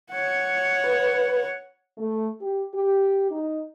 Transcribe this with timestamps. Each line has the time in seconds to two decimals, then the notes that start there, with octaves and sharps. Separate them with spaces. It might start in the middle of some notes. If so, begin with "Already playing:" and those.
0.11 C#5 F#5
0.84 B4
1.98 A3
2.40 G4
2.73 G4
3.30 D#4